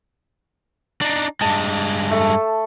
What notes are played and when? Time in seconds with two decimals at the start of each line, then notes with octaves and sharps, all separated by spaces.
1.02 D4 D#4
1.41 G2 G#3 A5
2.11 A3